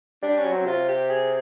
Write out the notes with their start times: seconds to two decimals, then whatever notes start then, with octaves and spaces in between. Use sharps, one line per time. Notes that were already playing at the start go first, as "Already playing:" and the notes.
0.23 G3 D4
0.38 C#4
0.45 F#3
0.52 C4
0.66 C3 F4
0.88 G4
1.10 G#4